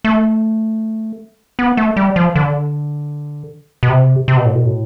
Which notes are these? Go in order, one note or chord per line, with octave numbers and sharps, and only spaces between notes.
A3
B3
A3
G3
F3
D3
B2
C3
C3
B2
A2
B2
A2